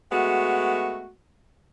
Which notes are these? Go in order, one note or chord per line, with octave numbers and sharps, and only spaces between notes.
G#3 A3 B3 F#4